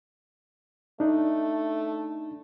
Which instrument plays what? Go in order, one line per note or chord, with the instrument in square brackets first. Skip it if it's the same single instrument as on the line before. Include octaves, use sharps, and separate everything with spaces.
[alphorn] A3 [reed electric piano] D4 D#4